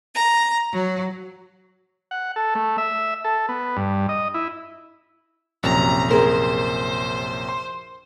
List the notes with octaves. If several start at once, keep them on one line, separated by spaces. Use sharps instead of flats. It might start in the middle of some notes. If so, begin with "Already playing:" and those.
A#5
F#3
F#5
A4
A3
E5
A4
B3
G2
D#5
E4
A#1 F#2 C3 A#5
G#4 A#4 C5
C6